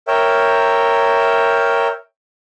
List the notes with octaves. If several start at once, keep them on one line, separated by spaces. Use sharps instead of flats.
A#4 C#5 E5 G5